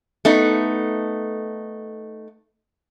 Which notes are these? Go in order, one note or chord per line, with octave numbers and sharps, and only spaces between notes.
A3 B3 D#4